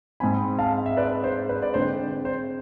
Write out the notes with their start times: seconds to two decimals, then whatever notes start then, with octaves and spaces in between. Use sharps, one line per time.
0.20 G#2 G#3 C4 G#5 B5
0.59 F5 A5
0.86 E5
0.97 B4 D5
1.24 C5
1.49 B4
1.62 D5
1.74 D3 G#3 C4 C5
2.25 C5